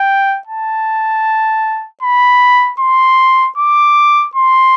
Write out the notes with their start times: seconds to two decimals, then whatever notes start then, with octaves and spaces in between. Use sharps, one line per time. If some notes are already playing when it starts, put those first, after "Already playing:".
Already playing: G5
0.47 A5
2.03 B5
2.79 C6
3.57 D6
4.35 C6